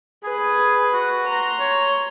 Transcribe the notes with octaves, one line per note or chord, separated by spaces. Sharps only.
G#4 B4
F#4
A#5 C6
C#5